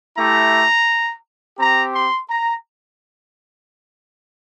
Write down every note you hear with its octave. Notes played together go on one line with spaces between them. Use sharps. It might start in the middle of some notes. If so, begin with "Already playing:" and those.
A3 E4 G4 A#5
C4 G4 A#5
C6
A#5